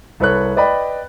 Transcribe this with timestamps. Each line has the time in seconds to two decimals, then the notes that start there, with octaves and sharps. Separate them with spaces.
0.20 C2 A4 B4 C#5 F#6
0.56 B4 D5 D#5 G5 B5